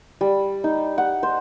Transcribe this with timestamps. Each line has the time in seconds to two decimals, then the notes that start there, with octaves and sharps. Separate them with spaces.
0.21 G3
0.64 D#4
0.98 F#5
1.23 C5